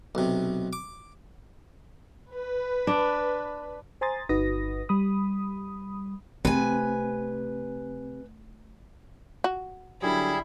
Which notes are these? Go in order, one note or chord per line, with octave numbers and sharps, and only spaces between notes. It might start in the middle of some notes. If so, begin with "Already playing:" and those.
B1 C3
D6
B4
D4
C5 G#5 A#5 C6 D#6 A6
G1 D#4 F#4 B4 D#6 A#6
G3 B5 D#6
C3 A3 C4 B4 G#5
F#4
D3 F#3 G3 E4 G#4